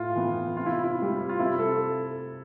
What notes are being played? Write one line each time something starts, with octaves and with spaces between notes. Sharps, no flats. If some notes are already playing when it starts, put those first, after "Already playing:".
Already playing: A2 F4
E3 B3
C3 F4
E4
E4
G3 C4
F4
C3 E4
A4